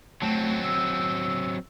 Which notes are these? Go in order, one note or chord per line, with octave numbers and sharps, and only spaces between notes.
F#3 A3 C4
E6